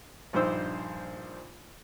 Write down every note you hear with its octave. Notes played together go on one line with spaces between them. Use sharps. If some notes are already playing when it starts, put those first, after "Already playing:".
A#1 G2 D#4 C5 E6